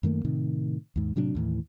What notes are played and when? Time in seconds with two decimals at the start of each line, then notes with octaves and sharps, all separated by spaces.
0.03 F#2 D#3 A3 A#3
0.25 A2 C3 D#3
0.96 D#2 G#2
1.16 A2 C3 F#3 D4
1.35 D#2 A2 E3